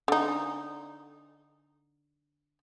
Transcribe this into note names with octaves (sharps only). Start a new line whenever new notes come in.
D3 D#4